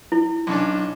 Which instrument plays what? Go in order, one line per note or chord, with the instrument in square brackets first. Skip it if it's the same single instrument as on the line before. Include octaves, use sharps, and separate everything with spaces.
[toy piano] E4
[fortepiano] B1 C#4 D4